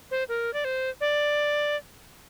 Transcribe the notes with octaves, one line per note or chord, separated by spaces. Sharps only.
C5
A#4
D5
C5
D5